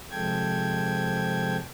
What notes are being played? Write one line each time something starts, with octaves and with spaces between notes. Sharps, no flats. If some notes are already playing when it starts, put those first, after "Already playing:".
C3 F3 G#3 A4 G5 G#6